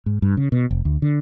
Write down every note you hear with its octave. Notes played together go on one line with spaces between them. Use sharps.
G#2
G2
C#3
B2
F1
D2
D3